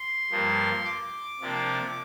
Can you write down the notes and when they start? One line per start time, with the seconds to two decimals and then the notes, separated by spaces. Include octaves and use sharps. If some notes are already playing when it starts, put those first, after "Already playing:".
Already playing: C6
0.31 G2 F3 A#3
0.85 D6
1.41 C3 F3 A#3 D4